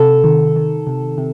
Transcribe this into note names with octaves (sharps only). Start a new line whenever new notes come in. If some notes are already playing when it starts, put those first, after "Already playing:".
Already playing: C3 A4
D#3
D#3
C3
C3